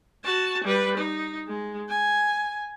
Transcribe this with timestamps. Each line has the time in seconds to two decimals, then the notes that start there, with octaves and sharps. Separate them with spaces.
0.24 F#4 A5
0.64 G3 B4
0.98 D#4
1.47 G#3
1.89 G#5